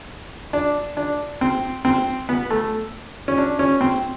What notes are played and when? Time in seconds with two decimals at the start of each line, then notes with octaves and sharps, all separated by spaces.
0.53 D4
0.97 D4
1.41 C4
1.85 C4
2.29 B3
2.50 A3
3.28 C#4
3.38 D4
3.59 C#4
3.81 C4